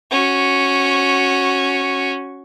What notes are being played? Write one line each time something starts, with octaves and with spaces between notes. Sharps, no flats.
C#4 F#4